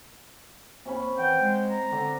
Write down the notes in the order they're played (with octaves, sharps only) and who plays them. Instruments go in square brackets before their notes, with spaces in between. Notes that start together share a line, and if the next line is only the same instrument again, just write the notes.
[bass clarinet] D#2 [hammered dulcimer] C3 C#4 B5
[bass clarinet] E3 [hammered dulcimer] F#5 [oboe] G5
[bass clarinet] G#3
[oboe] A#5
[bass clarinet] D3 [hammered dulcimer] C4 D4